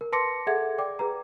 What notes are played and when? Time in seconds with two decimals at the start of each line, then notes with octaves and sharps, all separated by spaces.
0.01 A#4
0.12 B4 A5 C6 D6 A#6 C#7
0.47 G#4 A4 E5 F#5 G#6
0.78 D5 G5 D6
0.99 G#4 B4 A#5